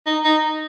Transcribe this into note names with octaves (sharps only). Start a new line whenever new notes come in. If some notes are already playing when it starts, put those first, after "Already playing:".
D#4
D#4